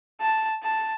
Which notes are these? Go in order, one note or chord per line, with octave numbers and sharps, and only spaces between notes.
A5
A5